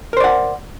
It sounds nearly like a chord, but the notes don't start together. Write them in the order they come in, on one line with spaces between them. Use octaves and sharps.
A#4 C5 D5 F#5